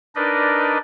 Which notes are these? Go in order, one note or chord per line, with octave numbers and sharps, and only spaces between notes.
D4 D#4 A#4 B4 D5 D#5